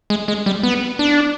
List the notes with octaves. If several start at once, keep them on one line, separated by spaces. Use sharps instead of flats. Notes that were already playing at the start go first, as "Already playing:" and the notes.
G#3
G#3
G3
B3
D4